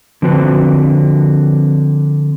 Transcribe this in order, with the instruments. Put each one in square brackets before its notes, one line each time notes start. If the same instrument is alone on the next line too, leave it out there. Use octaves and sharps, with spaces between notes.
[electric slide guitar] D3 F3 C4 F#4 B4